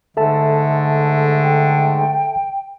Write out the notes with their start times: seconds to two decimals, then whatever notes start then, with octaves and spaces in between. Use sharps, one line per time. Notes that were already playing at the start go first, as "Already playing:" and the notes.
0.17 G#2 D3 G#3 A3 A4 E5 A5
1.43 G5